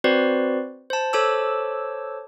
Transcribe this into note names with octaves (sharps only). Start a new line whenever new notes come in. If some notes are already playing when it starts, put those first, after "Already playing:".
C4 F#4 B4 C5 D5
C5 A5
A4 C5 C#5 A5 D6 E6